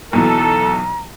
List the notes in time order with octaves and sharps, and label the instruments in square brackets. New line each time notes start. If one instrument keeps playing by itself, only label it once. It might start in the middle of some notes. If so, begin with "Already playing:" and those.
[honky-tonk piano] B1 B2 E3 [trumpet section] A4 [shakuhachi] A#5